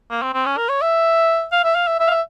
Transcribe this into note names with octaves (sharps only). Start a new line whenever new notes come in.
A#3
C4
C4
C#4
A#4
C#5
E5
F5
E5
F5
E5
E5
F5
E5